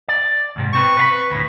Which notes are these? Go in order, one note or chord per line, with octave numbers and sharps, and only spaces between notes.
D5
D2 G#2 C3
C3 C4 B4 C#6
B4 F5 B5
D2 A2